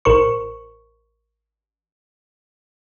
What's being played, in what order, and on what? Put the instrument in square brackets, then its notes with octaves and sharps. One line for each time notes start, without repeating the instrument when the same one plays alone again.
[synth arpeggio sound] A1 A#4 C5 C#6